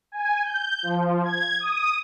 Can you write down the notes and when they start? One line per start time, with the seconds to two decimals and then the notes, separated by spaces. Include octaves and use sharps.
0.12 G#5
0.44 G6
0.83 F3
1.24 G#6
1.60 D#6